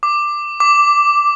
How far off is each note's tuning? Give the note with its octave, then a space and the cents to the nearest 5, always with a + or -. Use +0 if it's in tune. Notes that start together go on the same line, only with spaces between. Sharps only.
D6 +10
D6 -5